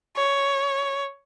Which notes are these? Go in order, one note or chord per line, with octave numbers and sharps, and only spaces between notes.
C#5